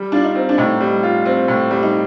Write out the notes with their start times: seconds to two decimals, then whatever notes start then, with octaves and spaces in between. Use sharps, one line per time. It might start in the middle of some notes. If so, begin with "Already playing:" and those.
Already playing: G3
0.12 D4 F4
0.24 D#4
0.35 C4
0.49 D4
0.58 A2 D#4
0.81 G3
1.03 F4
1.25 C4
1.48 A2
1.71 G3
1.83 D#4